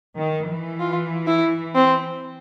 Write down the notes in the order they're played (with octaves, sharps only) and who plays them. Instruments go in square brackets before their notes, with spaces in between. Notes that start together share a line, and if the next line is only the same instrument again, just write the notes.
[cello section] D#3
E3
[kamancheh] F4
E4
C4